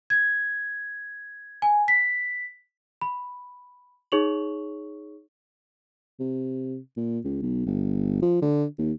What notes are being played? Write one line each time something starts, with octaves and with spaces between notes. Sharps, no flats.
G#6
G#5
B6
B5
D#4 G#4 C#5 C#6 F7 F#7
C3
A#2
C#2
B1
G1
F3
D3
D#2